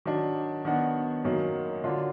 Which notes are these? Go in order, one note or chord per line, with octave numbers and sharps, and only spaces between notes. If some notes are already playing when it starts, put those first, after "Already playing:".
D#3 F#3 D4
D#3 F#3 B3 D4 F#4
F#2 D#3 F#3 A#3
D3 F#3 D4 F4